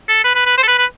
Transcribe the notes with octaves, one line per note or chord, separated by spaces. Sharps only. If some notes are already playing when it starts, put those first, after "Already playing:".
A4
B4
B4
B4
C5
A4
B4
B4